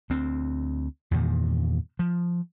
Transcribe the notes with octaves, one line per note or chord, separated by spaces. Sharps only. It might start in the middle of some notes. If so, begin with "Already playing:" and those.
D2 C4
E2 G2 A#2 D#3
F3